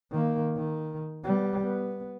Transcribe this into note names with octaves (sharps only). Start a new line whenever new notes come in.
D#3 A#3
D#3
G3 B3
B3